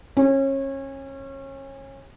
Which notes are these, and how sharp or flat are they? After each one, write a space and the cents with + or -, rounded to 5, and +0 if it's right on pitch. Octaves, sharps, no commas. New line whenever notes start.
C#4 -30